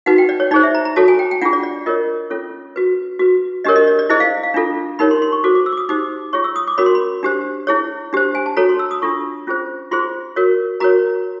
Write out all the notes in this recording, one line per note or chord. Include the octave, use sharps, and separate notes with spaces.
D#4 F#4 B4 F#5
G5
D5
C#5
D#4 G#4 C5 D5
E5
A#5
A#5
F#4 A4 C#5 A5
G#5
G5
G5
D4 F4 G#4 F#5
D5
D5
F4 A#4 C#5 D#5
C#4 F4 A4 C#5
F#4 B4
F#4 B4
D4 G4 A#4 C#5 D#5
D#5
D5
D5
E4 G#4 C5 D#5
F5
F5
D4 F4 A4
D#4 G4 A#4 C#5 B5
C6
C6
C#6
F#4 A4 C5 D6
D6
E6
D6
D#6
D#4 G4 C5 D6
F4 G#4 C#5 C#6
E6
D#6
D6
C#4 F#4 A#4 C#5 B5
C6
B5
D4 G4 C5
E4 G#4 C#5
D4 G4 C5
G#5
A5
F#4 A4 C#5 A#5
C6
E6
D#6
D4 F4 A4 C#6
C#4 F4 G#4 C5
F4 G#4 C5 C6
F#4 A#4 C#5
F#4 A#4 C#5 A#5